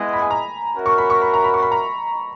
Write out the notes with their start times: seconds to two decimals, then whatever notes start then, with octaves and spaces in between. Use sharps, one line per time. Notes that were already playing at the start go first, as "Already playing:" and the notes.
Already playing: G#3 B3 E4 G#4 D#5
0.13 B5
0.22 G#5
0.31 A#5
0.74 C#4 F#4 A#4 E5
0.86 C#6
0.98 B5
1.10 C#6
1.22 B5
1.34 A#5
1.44 B5
1.54 C#6
1.63 B5
1.72 A#5